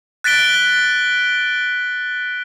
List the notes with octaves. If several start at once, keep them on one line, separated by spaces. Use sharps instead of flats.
F#6 A6 B6 D7 G7